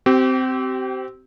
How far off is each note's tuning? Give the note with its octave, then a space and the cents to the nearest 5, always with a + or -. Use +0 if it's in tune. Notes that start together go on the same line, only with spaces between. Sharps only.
C4 -10 G4 -35